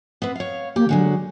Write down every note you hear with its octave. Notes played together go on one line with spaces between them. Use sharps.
B3 C4 B4
C#5 F5
A#3 G4
D3 F#3 G#3 F#4